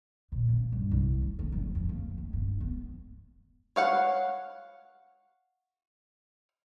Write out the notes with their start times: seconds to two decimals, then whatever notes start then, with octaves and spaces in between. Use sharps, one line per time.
0.32 A#2
0.49 C#3
0.72 G2
0.91 C2
1.22 D2
1.39 A#3
1.52 F#1
1.75 F2
1.89 A#3
2.18 A3
2.33 G2
2.60 B3
3.76 C#5 F5 F#5